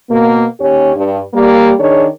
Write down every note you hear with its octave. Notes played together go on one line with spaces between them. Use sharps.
B2 A#3
D#2 C#4 G4 C#5
G2
G3 A#3
D#3 D4 G#4 C#5